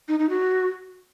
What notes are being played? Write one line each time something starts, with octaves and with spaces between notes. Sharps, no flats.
D#4
D#4
F#4